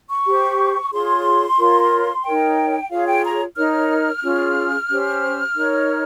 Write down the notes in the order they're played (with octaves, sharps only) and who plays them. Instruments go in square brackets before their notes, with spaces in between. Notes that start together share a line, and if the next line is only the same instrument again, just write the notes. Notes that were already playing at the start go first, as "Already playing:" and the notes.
[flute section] C#6
G4 C5
F4 G#4 C#5 C6
F4 A#4 C#5
D#4 A#4 C#5 G5
F4 G#4 C#5 F5
G5
A#5
D#4 A#4 C#5 F6
C#4 F4 G#4
C#4 G4 C5
D#4 A#4 C#5